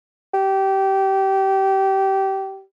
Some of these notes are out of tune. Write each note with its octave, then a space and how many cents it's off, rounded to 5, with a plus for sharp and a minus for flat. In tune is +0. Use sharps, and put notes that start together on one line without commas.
G4 -20